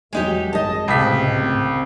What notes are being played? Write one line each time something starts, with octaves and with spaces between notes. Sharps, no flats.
E2 F#3 G#3 D#4 G4
G#1 F#2 G#3 D#5 A5
C#2 A2 C3 C4 B6
G#1 C4